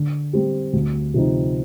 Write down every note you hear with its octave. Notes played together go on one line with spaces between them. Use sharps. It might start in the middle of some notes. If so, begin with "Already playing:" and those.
Already playing: D3
G3 C4 G4
D2
C3 F3 C4 D#4